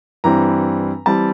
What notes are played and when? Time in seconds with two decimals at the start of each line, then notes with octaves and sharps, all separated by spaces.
0.24 G2 E3 G3 C4 A#5
1.06 E3 G3 C4 A5